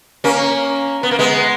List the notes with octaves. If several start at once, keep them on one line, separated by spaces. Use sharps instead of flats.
A#3 C#4
B3
A#3
G#3 B3